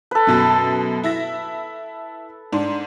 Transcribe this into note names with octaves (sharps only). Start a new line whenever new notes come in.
A4 B4
F#2 B2 A6
E4 E5 A#6
G#2 D4